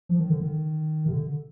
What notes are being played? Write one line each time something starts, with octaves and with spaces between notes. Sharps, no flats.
F3
D#3
D3
D#3
C3
D3